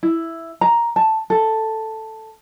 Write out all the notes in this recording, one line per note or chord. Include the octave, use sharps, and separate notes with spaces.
E4
A#5
A5
A4